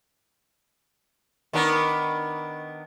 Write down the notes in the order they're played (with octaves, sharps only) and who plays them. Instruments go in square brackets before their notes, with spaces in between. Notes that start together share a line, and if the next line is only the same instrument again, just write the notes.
[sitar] D#3 B3 D4